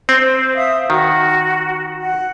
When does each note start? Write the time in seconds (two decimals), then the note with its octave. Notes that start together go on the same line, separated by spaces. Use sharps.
0.09 C4 C5
0.55 E5 F5 D#6
0.90 D#3 F#4
2.00 F#5